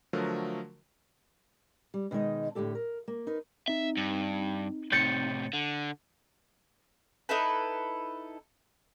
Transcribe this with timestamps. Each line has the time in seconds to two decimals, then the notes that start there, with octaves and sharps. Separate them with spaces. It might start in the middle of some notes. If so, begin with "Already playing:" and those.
0.13 D3 F3 F#3 A3 A#4
1.94 G3
2.11 B2 D#3 G#3 D#4 D#5
2.55 A2 D3 G#3 G4 A4
2.75 A#4
3.08 A#3
3.27 D#4 A#4 B4
3.68 C4 D#4 E5
3.97 G2
4.92 A2 C3 G6 A6 C#7
5.53 D3
7.29 D#4 E4 A4 B4